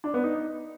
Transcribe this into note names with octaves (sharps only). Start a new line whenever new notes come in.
D4
B3
D#4